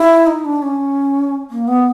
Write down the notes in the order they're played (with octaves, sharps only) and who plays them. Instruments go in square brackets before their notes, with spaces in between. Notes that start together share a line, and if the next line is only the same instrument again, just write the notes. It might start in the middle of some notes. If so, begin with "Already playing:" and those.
Already playing: [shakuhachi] E4
D#4
D4
C#4
A#3
B3